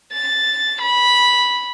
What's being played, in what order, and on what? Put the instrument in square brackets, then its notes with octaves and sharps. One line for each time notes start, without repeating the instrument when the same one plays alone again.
[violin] A6
B5